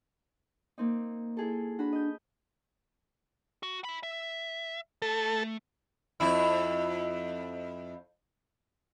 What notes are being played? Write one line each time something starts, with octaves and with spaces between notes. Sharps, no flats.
A#3 C4 D#4
E4 G#4 A4
D4 F#4 B5
D#5 G6
F#4
E5 B5
E5
A3 A4
F2 E4